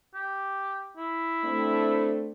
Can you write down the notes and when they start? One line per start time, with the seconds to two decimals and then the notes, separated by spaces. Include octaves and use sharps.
0.15 G4
0.97 E4
1.44 A3 C4 D4